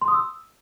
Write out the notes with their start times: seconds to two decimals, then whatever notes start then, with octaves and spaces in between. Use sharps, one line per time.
0.01 C6
0.08 D#6
0.14 E6